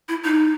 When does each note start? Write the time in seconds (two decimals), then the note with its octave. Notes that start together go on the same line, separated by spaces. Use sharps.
0.09 E4
0.25 D#4